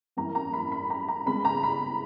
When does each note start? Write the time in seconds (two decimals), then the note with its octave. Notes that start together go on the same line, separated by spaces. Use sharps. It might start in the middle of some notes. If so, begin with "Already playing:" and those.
0.17 F#2 E3 A#3 A#5
0.35 A#5
0.53 B5
0.72 B5
0.90 A#5
1.08 A#5
1.26 C#3 G#3 B3 B5
1.45 A#5
1.63 B5